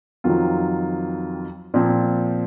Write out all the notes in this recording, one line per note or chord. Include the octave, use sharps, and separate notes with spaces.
F2 D#3 F#3 C4 F4
A#2 F3 C4